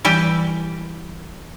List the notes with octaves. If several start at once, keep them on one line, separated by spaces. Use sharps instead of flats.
E3 G3 G4